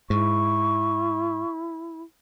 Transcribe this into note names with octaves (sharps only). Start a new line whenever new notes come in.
G#2 E4 C#6